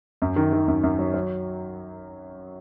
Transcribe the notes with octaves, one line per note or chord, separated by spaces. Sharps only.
F#2
D#3
D#3
F#2
F#2
F#3
F#3